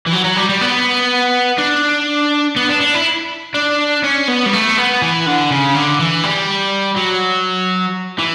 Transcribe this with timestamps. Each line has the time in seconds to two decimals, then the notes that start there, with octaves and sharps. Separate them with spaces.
0.06 E3
0.12 F#3
0.24 F#3
0.36 G3
0.49 G3
0.61 B3
1.59 D4
2.56 B3
2.69 D4
2.81 D4
2.94 E4
3.54 D4
4.03 C#4
4.28 B3
4.46 G3
4.53 A3
4.77 B3
5.02 E3
5.26 D3
5.51 C#3
5.75 D3
5.99 E3
6.23 G3
6.96 F#3
8.18 E3